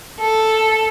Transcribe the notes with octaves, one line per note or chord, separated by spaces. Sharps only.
A4